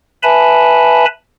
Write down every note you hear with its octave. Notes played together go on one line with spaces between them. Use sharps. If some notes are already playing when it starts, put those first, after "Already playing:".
B4 E5 G#5 A5 B5